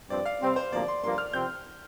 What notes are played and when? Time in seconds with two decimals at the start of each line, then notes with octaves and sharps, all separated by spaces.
0.10 G2 F3 C4 D5
0.26 F5
0.41 C3 G3 C4
0.56 C5
0.72 D2 C3 F3 A#3 D5
0.88 C6
1.03 G2 F3 A#3 C6
1.18 F6
1.33 C3 F3 C4 G6